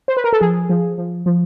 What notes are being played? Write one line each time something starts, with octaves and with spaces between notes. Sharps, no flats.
C5
B4
A#4
A4
F3 G#4
F3
F3
F3